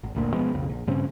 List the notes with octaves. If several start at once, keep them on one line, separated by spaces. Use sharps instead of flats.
G#1
F#1 D2 A#2
B2 F3 G#3 B3
B1 F2 C#3
A#1
G2 C#3 C4